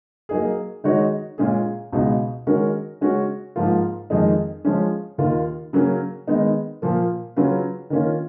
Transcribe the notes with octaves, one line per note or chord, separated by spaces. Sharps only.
F#3 A#3 D#4 G#4
D#3 G#3 D#4 F#4 C#5
A#2 G#3 C#4 G#4
C#2 B2 G#3 D#4
D#3 G#3 C#4 F#4 A#4
C#3 G#3 C#4 F#4
G#2 F3 A#3 F4
F2 D#3 G#3 D#4 G#4
F3 G#3 C#4
D#2 D#3 A#3 F4
C#3 F#3 A#3 C#4
D#3 G#3 B3 D#4
A#2 F3 A#3
C#3 F#3 C#4 F4 B4
D#3 A#3 C#4 F4